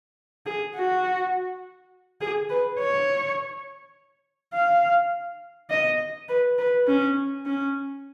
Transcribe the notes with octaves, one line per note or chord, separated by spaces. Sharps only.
G#4
F#4
G#4
B4
C#5
F5
D#5
B4
B4
C#4
C#4